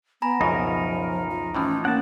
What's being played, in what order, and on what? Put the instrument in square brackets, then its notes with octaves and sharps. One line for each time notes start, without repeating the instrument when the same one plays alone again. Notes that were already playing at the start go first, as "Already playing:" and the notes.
[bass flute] B3 [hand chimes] G#5 A#5 B5
[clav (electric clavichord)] C#2 F#2 B2 [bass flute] F3 [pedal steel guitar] D#4 A#4
[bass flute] F4
[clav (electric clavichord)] A2 E3 F3 [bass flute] C#4
[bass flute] A#3 [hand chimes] C#4 [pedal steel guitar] F#5 A5